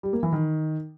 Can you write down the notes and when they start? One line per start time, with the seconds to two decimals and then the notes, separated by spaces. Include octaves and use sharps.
0.03 G3
0.13 A#3
0.23 E3
0.33 D#3